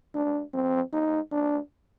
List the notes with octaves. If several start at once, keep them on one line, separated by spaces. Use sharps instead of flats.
D4
C4
D#4
D4